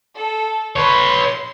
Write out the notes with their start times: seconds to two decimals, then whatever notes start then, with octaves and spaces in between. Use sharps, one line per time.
0.16 A4
0.76 B4 C#5 C6